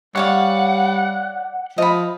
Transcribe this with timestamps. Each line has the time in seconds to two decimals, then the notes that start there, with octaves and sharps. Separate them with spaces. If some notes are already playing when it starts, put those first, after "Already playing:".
0.16 G3 C#5 D5 F5 F#5
1.78 F3 D#5 B5